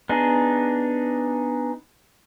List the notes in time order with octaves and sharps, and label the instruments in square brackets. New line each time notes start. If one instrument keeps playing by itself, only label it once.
[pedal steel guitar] B3 D4 D#4 G#4